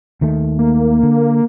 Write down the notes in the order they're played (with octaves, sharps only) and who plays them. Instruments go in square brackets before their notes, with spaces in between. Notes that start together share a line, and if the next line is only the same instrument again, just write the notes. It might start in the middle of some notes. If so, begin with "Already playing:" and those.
[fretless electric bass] D#2 D#3 A3
[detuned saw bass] A#3
[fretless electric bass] D3